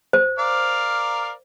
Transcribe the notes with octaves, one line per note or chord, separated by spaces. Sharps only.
C5
A#4 D5 F5